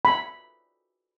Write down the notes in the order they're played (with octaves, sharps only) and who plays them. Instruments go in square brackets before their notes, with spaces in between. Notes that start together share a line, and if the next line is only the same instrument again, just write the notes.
[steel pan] B5